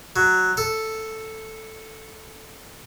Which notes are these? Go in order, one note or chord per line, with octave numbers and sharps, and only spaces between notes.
F#3
A4